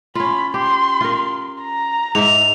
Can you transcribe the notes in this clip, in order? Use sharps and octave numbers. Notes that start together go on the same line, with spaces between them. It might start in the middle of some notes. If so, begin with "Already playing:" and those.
C#4 F4 B5
G4 C6
F4 A#4
A#5
G#2 E5 F7